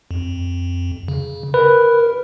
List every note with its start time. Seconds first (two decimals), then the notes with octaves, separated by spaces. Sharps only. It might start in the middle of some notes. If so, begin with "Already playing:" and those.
0.11 F2
1.08 C#3
1.54 A#4 B4